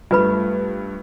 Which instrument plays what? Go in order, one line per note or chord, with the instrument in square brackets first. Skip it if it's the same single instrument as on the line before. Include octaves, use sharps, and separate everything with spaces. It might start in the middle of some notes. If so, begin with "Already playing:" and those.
[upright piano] G2 A3 [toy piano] F4 B4 B5